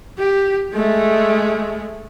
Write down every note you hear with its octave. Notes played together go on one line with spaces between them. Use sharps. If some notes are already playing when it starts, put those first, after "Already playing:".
G4
G#3 A3